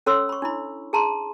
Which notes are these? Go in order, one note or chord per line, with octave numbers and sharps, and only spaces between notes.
C#4 A4 C#5 C6 E6
B5 C#6
D4 E4 B5
G#4 A5 A#5 C6